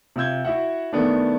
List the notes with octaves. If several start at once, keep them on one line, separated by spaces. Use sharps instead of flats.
C3 F4 E6 G6 G#6
E4 F#4 E5 F#5
D#3 A3 B3 D4